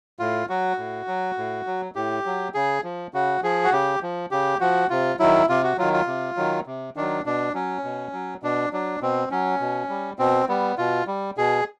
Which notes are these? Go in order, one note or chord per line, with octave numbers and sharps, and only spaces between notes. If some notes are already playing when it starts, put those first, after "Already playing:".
A2 F4
F#3 F#4
A2
F#3
A2
F#3
A2 G4
F#3
C#3 G#4
F3
C#3 F#4
F3 G#4
F#4
C#3 G4
F3
C#3 G4
F3 F#4
C3 F4
D#3 F#3 E4
C3 F4
F#4
D#3 F#3 F4
F4
C3
D#3 F#3
C3
D#3 F#3 D4
B2 D4
F#3 C#4
B2
F#3
B2 D4
F#3 D4
B2 C4
F#3 C#4
B2
G3
B2 C4
G3 B3
B2 F4
G3
B2 G#4